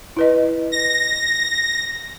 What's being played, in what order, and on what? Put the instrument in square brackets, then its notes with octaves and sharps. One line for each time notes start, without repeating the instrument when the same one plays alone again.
[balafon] E4 B4 D#5
[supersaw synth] A#6